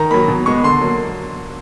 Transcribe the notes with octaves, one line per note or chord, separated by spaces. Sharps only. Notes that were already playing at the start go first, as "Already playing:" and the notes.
Already playing: D#3 A#5
F#3 A#3 B5
B2
G#3 B3 C#6
D3 C6
F#3 A#3